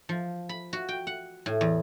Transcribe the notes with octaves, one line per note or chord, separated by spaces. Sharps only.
F3
B5
F#4
G5
F#5
A2
E2